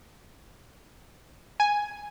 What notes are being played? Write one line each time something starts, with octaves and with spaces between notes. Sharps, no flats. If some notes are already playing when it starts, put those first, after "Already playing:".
G#5